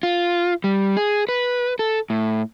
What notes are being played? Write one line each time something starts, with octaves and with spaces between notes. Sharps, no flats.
F4
G3
G#4
B4
A4
A2